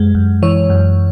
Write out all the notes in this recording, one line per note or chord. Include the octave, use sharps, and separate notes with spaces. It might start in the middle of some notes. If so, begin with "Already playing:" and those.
Already playing: F#2 G#3
F#2
E3 C#5
F#2